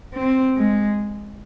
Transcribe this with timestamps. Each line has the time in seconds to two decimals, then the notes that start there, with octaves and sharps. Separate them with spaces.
0.14 C4
0.57 G#3